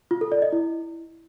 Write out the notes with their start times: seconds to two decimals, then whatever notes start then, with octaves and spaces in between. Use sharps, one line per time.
0.11 F4
0.21 A4
0.32 D5
0.42 D#5
0.52 E4